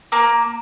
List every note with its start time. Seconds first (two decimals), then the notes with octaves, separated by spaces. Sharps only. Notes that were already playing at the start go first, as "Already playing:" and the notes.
0.12 A#3